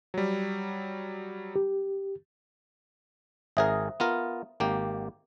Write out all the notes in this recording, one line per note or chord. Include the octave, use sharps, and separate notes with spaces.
F#3 G3
G4
G#1 G#4 A#4 C5 E5 D#6
B3 F4 A#4
G#1 A#3 G4